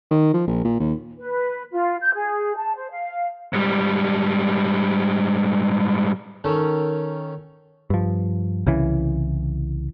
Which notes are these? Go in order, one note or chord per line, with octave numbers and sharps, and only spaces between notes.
D#3
F3
A#1
A#2
D#2
B4
F4
G6
G#4
A5
C5
F5
G#2 G3
D#3 C#4 A4
G2 F3
C2 C#3 E3